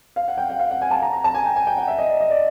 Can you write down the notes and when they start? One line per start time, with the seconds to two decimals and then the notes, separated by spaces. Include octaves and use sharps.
0.16 F5
0.28 F#5
0.38 G5
0.50 F#5
0.59 F5
0.71 F#5
0.82 G#5
0.91 A5
1.02 A#5
1.13 A#5
1.24 A5
1.35 G#5
1.45 G5
1.56 G#5
1.67 G5
1.77 F#5
1.88 E5
1.99 D#5
2.09 D5
2.21 D#5
2.30 D5